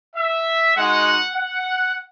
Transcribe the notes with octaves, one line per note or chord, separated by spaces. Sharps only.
E5
G#3 D#4 F#4 F#5
F#5